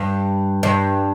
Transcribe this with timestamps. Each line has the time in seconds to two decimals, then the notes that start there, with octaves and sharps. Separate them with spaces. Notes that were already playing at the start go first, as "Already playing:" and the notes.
Already playing: G2
0.63 G2